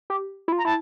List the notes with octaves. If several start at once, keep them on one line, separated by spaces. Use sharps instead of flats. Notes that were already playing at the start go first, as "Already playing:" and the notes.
G4
E4
F4
A#5
E4 A5